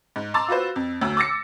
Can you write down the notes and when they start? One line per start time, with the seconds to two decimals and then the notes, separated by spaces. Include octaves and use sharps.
0.16 G#2
0.34 A5 A#5 C6 D6 E6 A6
0.48 F4 F#4 B4 C5
0.76 F2
1.01 D2 F#3 E6
1.17 D6 E6 A6 A#6 C#7